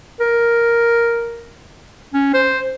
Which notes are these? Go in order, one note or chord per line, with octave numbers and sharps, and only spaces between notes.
A#4
C#4
C5